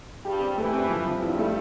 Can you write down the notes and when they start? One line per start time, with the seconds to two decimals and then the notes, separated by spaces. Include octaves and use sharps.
0.25 G2 G3 G4
0.41 C4
0.57 E3 A3
0.74 C4
0.90 F3
1.06 F3
1.22 G2 G3 E4
1.38 A3